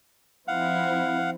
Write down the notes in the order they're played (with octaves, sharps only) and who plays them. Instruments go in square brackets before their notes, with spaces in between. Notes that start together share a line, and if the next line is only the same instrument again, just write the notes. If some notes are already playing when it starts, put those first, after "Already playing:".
[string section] F3 C4 E4 [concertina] F5 F#5